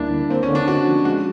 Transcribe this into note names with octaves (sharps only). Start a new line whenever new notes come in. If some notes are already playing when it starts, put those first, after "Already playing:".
Already playing: D2 G3 A#3 D4 E4
D3
A#3 C4
C#4
D3
D4
D#4 F#4
F3
G#3 F#4